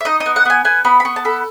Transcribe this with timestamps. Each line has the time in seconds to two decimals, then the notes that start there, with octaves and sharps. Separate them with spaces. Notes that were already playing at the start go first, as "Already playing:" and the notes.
0.01 E5
0.05 D#4 D#5
0.20 D#5
0.26 B3
0.36 F#5
0.45 B3 G#5
0.65 B3 G#5
0.85 B3 B5
1.00 B5
1.05 B3 C#6
1.16 A5
1.25 A4 B5